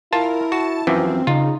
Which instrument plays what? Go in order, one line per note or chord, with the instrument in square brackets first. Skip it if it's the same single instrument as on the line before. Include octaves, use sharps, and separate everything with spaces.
[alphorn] E4 [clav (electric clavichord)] F4 A5 [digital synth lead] A#4
[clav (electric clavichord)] F#4 [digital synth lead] A5
[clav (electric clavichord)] F#2 E3 F3 [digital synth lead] C4
[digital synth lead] C#3 [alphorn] D#4 [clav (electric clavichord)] F4